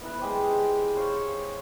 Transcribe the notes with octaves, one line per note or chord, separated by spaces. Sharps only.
B3 E4 B4
G#3 G4 C5
C5 C#5 F5